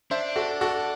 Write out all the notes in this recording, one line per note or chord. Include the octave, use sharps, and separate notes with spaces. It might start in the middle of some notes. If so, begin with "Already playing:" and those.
D4 C5 E5
F#4 A4
F#4 A4